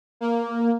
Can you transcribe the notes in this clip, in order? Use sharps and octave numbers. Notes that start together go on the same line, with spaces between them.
A#3